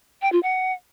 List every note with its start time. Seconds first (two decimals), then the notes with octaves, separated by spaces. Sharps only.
0.22 G5
0.32 F4
0.43 F#5